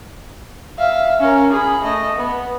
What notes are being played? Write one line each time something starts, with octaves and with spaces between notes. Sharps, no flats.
E5 F5
C#4 A#4
G#4 B5
A3 D#5
B3